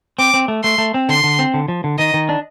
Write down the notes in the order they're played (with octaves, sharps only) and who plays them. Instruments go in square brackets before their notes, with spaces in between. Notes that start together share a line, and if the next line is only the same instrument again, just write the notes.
[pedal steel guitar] C4 [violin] D6
[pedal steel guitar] C4
A3
[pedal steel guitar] A3 [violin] C6
[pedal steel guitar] A3
C4
[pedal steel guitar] D3 [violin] C6
[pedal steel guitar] D3
C4
D3
F3
D3
[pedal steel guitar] D#3 [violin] D#5
[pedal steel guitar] D#3
D4